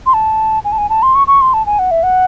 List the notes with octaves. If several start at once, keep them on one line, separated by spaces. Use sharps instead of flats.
C6
A5
G#5
A5
G#5
A5
C6
C#6
C#6
C6
A5
G#5
F#5
E5
F#5